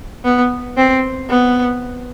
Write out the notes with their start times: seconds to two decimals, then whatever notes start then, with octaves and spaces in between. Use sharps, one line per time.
0.25 B3
0.77 C4
1.30 B3